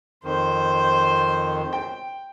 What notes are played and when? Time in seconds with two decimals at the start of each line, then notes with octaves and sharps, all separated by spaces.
0.24 F2 D#3 C5
1.73 G5